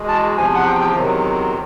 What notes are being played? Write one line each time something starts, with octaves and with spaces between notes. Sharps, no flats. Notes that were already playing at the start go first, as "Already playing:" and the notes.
Already playing: E2 B2 G#3
A5
E2 C3 F3 G#5
F#5
G5
G5
E2 C3 D#3 F#3